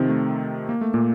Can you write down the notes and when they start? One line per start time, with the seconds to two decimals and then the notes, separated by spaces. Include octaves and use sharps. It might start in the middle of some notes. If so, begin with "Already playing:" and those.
Already playing: C3 D#3 F3 C4 D#4
0.09 A3
0.69 A#3
0.81 A3
0.94 A#2 A#3